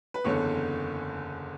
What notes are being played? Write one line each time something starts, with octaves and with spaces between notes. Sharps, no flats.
B4
F#1 E2 D3 C#5